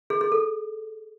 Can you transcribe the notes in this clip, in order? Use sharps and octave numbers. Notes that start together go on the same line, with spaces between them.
G#4
G#4
A4